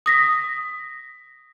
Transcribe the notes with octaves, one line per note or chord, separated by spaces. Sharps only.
D#6 A#6 B6